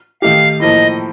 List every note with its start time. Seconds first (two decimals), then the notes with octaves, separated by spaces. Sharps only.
0.22 D#3 A3 D#4 G4 F5
0.60 A2 F3 A#3 D#5